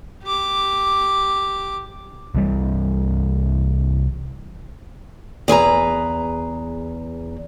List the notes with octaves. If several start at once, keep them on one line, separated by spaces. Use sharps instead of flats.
G4 D6
C2 E3 G3
E2 G#4 B4 A#5